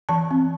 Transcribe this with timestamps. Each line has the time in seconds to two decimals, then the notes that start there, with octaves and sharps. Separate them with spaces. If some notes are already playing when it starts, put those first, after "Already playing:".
0.09 E3 A5
0.31 C4